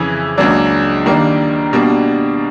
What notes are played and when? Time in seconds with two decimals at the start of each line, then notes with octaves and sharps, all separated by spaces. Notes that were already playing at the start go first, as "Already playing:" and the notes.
Already playing: F2 C#3 E3
0.38 C#2 C#3 F#3 A#3 D4
1.06 D#3 G3 A#3 D4
1.73 B2 G3 A#3 D4